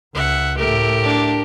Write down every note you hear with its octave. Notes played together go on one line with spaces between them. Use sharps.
C#2 E5 F#5
A2 A3 G4 A#4
D4